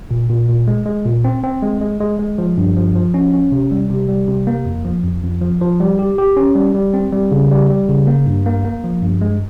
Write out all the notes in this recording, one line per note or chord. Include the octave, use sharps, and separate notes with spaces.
A#2
A#2
A#2
G#3
G#3
A#2
C4
C4
G#3
G#3
G#3
G#3
F3
G2
F3
F3
C#4
C#4
C3
G3
C3
G3
C3
A#3
F2
F3
F2
F2
F3
F3
G3
G4
G4
C#4
G3
G3
C4
G3
C#3
G3
G3
C#3
A#3
G2
A#3
A#3
F3
G2
G#3